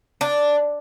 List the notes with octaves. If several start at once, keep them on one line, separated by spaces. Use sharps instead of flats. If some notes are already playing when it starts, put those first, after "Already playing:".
D4